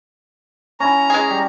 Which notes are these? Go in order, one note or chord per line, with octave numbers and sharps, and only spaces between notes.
C#4 E4 A#5 B5
G#3 G#4
G3